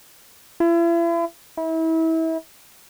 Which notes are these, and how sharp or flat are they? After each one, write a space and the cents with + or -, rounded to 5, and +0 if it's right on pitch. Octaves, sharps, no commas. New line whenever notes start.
E4 +40
E4 -30